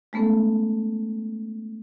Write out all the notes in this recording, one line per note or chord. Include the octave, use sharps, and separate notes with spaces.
G#3 A3 B3 C#4 A4